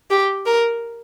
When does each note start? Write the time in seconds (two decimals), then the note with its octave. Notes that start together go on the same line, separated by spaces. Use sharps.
0.10 G4
0.46 A#4